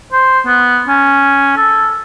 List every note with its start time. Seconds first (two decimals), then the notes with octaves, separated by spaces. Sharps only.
0.12 C5
0.46 B3
0.88 C#4
1.57 A4